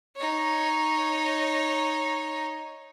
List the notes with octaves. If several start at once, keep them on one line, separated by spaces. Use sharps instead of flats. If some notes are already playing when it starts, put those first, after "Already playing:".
D#4 C#5